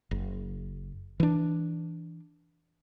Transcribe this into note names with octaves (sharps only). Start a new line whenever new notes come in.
F#1
E3 D4